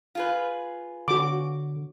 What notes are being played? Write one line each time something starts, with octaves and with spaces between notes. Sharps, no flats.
F4 G#4 B4
D3 F#4 D6